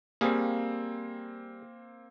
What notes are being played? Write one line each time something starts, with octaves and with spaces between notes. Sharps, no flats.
G3 A#3 C4 G#4 F5